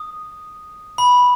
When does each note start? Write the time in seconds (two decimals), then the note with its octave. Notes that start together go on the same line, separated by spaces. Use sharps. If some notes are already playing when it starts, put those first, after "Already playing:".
Already playing: D#6
0.98 B5